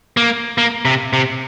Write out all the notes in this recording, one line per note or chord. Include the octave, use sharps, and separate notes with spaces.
A#3
A#3
C3
C3